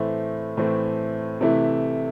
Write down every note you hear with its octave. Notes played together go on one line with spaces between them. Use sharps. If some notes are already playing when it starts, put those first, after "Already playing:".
Already playing: A2 E3 A3 C4
A2 E3 A3 C4
C3 E3 A3 E4